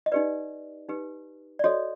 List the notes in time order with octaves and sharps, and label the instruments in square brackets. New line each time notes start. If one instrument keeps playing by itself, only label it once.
[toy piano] D#5
D#4 G4 B4 D5
D#4 G4 B4
D5
F#4 A4 C#5 D#5